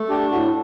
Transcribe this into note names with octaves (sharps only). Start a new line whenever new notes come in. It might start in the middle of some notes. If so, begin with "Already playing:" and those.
Already playing: A3
D4 G4
A2 F#4